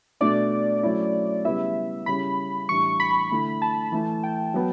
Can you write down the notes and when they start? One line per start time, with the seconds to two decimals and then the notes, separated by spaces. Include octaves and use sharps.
0.21 B2 A3 D4 D5
0.83 F#3 A3 C#4 E4
1.44 C#3 G3 B3 E4 E5
2.06 C#3 G3 C#4 E4 B5
2.69 A2 E3 G3 D4 C#6
3.00 B5
3.31 D3 A3 E4
3.62 A5
3.92 E3 A3 E4
4.23 G5
4.54 F#3 B3